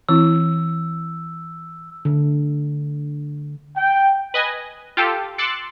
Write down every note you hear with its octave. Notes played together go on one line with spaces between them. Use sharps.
E3 C4 E4 E6
D3
G5
B4 D#5 G#5
F4 G4 A4
C6 D6 E6 F#6 A6 C#7